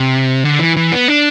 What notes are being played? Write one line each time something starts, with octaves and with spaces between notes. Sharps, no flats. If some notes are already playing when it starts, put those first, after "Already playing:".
Already playing: C3
D3
E3
E3
B3
D4